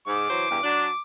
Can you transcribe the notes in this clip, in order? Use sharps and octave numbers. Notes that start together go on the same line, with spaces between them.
G#2 D6
E3 F#3 C5
E2 G2 G4
F#3 D4